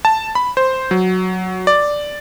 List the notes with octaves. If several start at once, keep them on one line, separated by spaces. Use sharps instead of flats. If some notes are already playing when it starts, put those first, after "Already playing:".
A5
B5
C5
F#3
D5